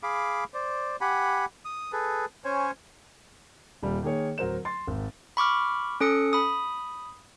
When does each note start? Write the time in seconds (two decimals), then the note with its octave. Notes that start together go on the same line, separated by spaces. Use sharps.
0.03 G#4 F5 B5 D6
0.54 C5 D5
1.01 G4 F#5 G#5 B5
1.65 D#6
1.92 G#4 A4 B4
2.45 C#4 C5 C#5 G#5
3.83 D#1 G3
4.03 D#3 A#3 G#4 C#5
4.38 D1 F#3 A#4 C5 E7
4.65 C6 A6
4.87 G#1
5.37 B5 C#6 D6 F6
6.00 C#4 A4 D#6 C#7
6.33 B5 D#6